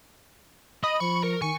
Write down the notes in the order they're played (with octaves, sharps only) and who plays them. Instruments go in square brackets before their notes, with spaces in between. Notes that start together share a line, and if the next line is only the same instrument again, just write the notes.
[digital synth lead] D#5 [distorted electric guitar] B5
[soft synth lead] F3 [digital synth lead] C#6
[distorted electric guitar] A#4
[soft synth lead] D#3 [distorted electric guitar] G#5 [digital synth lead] C#6